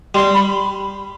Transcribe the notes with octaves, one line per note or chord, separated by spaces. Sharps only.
G3 C6
B5